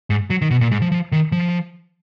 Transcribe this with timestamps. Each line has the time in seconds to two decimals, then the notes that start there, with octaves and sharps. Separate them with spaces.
0.10 G#2
0.30 F#3
0.42 D#3
0.51 B2
0.61 A#2
0.71 G#2
0.82 F3
0.92 F3
1.12 D#3
1.32 F3